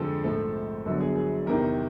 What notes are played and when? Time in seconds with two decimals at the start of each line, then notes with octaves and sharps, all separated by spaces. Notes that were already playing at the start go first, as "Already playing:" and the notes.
Already playing: F2 D3 F3 G#3 C4 A4
0.24 A#1 G#2 F3 A3 C4 A4
0.85 G1 F#2 D3 F#3 B3 A4
1.00 G#4
1.16 G#4
1.46 E2 C3 D#3 A#4